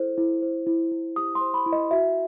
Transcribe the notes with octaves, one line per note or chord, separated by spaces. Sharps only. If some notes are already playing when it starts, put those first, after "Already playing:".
Already playing: E4 A4 C5
E4
C5
E4
E4
G4 D#6
C6
C5
B5
E4
D#5
F#4 E5